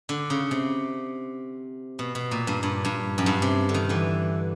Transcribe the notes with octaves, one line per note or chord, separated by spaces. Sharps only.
D3
C#3
C3
B2
B2
A#2
G2
G2
G2
F#2
G2
C3
D3
D#3
D3 E3